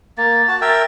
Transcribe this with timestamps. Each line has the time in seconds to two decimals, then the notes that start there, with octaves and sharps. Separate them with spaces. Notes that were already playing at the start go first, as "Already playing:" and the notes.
0.18 A#3 A6
0.48 F#4 A5
0.61 A#4 E5 G5